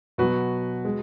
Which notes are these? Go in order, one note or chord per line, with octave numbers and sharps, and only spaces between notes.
B2 F#3 F#4 B4
G#3